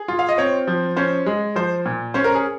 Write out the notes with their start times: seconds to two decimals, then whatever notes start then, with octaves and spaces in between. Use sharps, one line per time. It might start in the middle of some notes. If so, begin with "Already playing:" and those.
Already playing: G#4
0.08 F4
0.19 F5
0.29 D#5
0.38 C4 C#5
0.67 F3
0.97 C#4 C5
1.26 G#3
1.56 F3 C5
1.86 A#2
2.14 C#4 C5
2.24 A#4
2.35 G#4